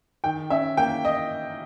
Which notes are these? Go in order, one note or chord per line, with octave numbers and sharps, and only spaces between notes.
D#3 G5
C#4 E5
A#3 G5
D#5